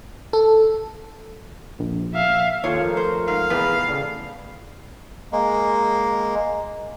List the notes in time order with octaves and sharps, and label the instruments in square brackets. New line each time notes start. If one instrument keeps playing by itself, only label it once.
[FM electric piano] A4
[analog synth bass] A#1
[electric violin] E5 F5
[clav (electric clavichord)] D#2 A4 [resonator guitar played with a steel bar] F4 C#5
[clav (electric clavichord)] F3 A3 [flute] A#4
[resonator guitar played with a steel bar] C5
[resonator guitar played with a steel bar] G#2 [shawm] F5
[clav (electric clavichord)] E2 E4 G#4 [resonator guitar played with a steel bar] A2 C3 B3
[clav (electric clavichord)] A2 C#3 [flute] D5
[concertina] G#3 A#3